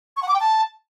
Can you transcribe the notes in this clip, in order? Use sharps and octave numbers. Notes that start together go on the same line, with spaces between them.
C#6
F#5
D6
G5
A5